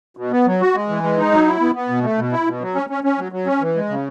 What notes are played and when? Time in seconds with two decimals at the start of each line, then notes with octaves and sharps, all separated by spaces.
0.17 B2
0.31 B3
0.46 F#3
0.61 F#4
0.75 G#3
0.89 E3
1.03 G#3
1.18 D#4
1.31 F#3
1.47 E4
1.61 B3
1.75 B3
1.89 B2
2.03 A3
2.18 B2
2.32 E4
2.47 B2
2.61 F#3
2.75 C#4
2.90 C#4
3.04 C#4
3.18 F#3
3.32 F#3
3.46 C#4
3.61 E3
3.76 G#3
3.89 C#3